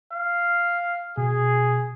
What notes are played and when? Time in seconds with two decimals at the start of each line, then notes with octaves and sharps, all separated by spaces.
0.12 F5
1.17 B2 G#4